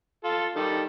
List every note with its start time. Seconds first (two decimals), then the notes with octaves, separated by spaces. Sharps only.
0.24 F4 A4
0.56 D#3 G3 A4